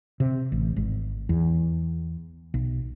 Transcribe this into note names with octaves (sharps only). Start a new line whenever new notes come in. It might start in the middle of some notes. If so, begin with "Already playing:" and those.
C3
A1
G#1
E2
B1